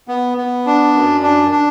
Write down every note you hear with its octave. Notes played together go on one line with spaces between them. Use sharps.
B3
B3
D4
F#2
D4
D4